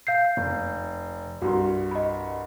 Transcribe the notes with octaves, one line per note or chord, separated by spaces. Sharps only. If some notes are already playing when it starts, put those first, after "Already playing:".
F5 G6 C7
F1
C2 G2 F#4 C6
D#5 B5